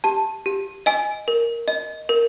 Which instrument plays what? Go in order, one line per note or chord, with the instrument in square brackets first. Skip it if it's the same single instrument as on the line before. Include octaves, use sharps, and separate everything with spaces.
[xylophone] G4 A5
G4
D#5 G#5
A#4
D#5
A#4